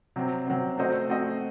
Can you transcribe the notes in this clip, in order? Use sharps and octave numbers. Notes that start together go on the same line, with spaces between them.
C3 F#3 C4
C3 F#3 C4
A3 C4 F#4 C5 D#5
A3 C4 F#4 C5 D#5